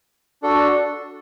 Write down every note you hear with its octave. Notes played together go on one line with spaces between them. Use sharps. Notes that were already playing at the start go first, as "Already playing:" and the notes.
D4 F#4 A4